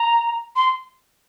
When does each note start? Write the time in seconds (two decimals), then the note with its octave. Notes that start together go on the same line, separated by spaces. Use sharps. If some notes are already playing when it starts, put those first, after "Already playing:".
Already playing: A#5
0.56 C6